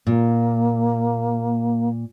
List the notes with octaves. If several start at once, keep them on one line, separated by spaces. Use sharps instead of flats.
A#2 A#3